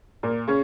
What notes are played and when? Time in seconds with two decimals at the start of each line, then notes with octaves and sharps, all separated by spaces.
0.23 A#2 A#3
0.47 C#3 C#4